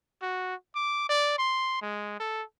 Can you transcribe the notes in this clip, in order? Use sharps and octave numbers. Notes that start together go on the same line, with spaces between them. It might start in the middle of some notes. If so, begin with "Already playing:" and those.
F#4
D6
D5
C6
G#3
A4